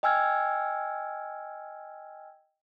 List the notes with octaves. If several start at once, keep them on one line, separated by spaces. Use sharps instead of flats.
D#5 G5 G#5 E6 F6 G#6